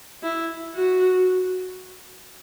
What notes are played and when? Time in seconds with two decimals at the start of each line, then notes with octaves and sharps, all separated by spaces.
0.23 E4
0.75 F#4